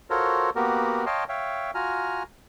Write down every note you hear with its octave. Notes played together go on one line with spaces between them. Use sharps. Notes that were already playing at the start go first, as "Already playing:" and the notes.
F4 F#4 A4 A#4 C5 C#5
A#3 B3 F#4 G4 A#4
C#5 D#5 F5 G5 A5 C6
C#5 E5 F5 G5
F4 F#4 G#5 A#5 F6